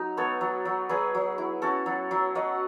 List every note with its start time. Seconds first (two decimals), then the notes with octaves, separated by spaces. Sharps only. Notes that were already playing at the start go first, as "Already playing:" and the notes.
Already playing: F#3 D#4
0.17 B3 A4 C#5
0.41 F#3
0.65 F#3
0.89 F#3 G#4 B4
1.15 F#3
1.38 E4
1.62 C#4 F#4 A4
1.86 F#3
2.11 F#3
2.35 F#3 D#5 F#5